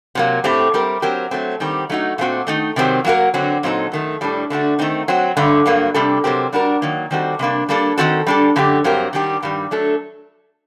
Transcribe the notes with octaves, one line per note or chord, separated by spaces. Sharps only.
C3 F#3 A#3
A2 A3 C4 G4
G3 C4 G4 A#4
F#3 C4 G4 A#4
F#3 A3 C4
D#3 G3 C4 G4
F#3 A3 D#4 F#4
A#2 A3 C4 F#4
D#3 A3 D#4
C3 D#3 F#3 C4 G4
F#3 A#3 F#4 A#4
D3 F#3 C4 F#4
A#2 F#3 C4 D#4 A4
F#2 D#3 A3
A2 G3 D4 A4
D3 A3 D4 F#4
D#3 A3 C4 D#4
F#3 C4 F#4
G2 D3 A3
G2 F#3 A#3
C3 G3 D4 A4
C3 F#3 C4 G4 A#4
G3 D4 F#4 A#4
D#3 F#3 A#3
D#3 G3 C4 F#4 A4
C3 G3 A#3 D4
G3 A#3 D4 A4
D#3 F#3 C4 F#4 A4
G3 D4 A4
F#2 D3 A3 D4 G4
G2 F#3 C4 G4 A#4
D#3 G3 D4 G4
G2 D#3 G3
F#3 A3 D4 A4